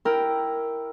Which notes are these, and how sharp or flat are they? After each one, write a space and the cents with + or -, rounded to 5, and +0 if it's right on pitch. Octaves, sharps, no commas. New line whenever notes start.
E4 +0 A#4 +0 G5 +0